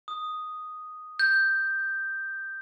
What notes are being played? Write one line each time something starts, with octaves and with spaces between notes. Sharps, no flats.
D#6
G6